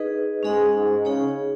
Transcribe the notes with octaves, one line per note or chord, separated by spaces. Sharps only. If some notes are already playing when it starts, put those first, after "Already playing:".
Already playing: D#4 G#4 B4 D#5
G#2 G#3 C#4 G#4 D#5 F#5
G#2 G#3
C#3 D#4 G#4 C#5